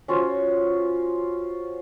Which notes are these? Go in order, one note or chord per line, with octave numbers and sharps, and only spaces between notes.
C#4 F4 F#4 C5